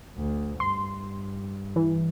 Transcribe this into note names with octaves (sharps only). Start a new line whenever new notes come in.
D2
G2 C6
E3